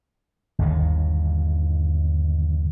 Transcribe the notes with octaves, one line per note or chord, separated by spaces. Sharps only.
G1 D#2 D#3